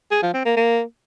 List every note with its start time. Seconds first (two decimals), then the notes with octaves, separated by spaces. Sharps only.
0.11 G#4
0.23 F3
0.34 C4
0.45 A#3
0.56 A#3